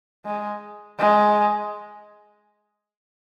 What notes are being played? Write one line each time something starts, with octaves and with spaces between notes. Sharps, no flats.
G#3
G#3